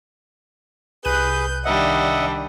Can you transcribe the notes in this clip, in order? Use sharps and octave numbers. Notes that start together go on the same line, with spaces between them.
C2 G#4 B4 F#6 G6 D#7
D#3 G3 D4 D#5 E5 F#5